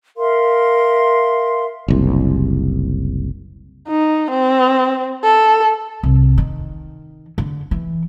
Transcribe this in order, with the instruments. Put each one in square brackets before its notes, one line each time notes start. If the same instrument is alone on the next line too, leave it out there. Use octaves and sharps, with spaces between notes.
[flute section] A#4 E5 F5 C6
[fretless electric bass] F#1 C2
[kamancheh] D#4
C4
A4
[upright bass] C2
D#3
D3
E3